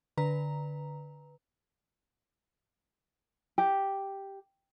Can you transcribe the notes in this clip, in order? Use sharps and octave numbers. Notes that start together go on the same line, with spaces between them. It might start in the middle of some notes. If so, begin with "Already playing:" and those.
D3 B4 A#5
G4